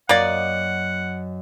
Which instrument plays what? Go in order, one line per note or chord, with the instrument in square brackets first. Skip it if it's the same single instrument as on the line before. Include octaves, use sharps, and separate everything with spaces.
[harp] F#2 D#5 [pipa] A#3 D5 [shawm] F#5